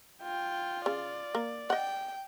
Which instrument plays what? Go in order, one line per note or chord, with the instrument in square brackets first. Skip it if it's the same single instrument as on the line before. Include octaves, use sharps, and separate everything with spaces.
[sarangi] F4 [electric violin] G5
[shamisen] C#3 [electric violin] D5
[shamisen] A#3
[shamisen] D#5 F#5 [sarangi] G5